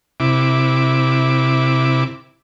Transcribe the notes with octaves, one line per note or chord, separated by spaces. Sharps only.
C3 E4 D6